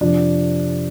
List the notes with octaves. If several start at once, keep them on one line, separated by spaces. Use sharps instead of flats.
F2 C3 F3 D4